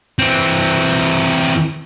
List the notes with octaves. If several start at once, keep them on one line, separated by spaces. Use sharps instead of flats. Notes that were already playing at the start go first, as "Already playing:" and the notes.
E3 C4